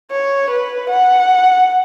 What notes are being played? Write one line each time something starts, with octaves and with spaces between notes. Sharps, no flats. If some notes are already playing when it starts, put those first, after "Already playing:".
C#5
B4
F#5